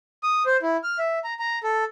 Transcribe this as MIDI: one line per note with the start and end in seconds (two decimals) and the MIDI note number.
0.23 0.43 87
0.46 0.57 72
0.62 0.77 64
0.84 0.98 89
0.99 1.19 76
1.24 1.34 82
1.39 1.59 82
1.63 1.84 69